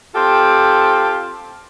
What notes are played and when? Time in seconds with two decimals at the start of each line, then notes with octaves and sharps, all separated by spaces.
0.14 C4 F4 G4 A4